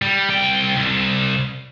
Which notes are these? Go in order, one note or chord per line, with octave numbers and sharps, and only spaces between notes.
G3
C2 G5
C2